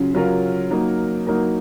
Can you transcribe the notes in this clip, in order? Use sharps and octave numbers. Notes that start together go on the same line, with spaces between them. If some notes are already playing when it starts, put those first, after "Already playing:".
Already playing: C#3 F#3 C#4 F4
C#3 F#3 C#4 F4 A#4
F#3 A#3 D#4 A#4
F#3 A#3 D#4 A#4